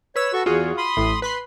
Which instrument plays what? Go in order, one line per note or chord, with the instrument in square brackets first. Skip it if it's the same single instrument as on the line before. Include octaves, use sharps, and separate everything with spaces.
[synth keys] B4 E6 [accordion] C#5
[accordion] F#4 A4 C#6
[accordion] E2 [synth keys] F4 F#4 G#4
[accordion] B5 C6 D#6
[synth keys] A1 A2
B4 B5 C6